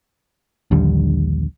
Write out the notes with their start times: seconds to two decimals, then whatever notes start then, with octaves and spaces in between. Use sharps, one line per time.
0.71 A#1 D#2 D3 G3